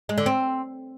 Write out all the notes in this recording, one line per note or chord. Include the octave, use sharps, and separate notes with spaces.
G#3
D3
C4